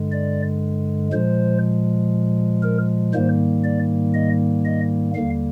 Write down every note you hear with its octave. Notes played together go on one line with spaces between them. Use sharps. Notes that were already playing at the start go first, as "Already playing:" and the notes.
Already playing: G2 D3 G#3
D5
A#2 F3 G#3 C5
A#4
G#2 D#3 G3 A#3 C5
D5
D#5
D#5
D#2 D3 G3 A#3 F5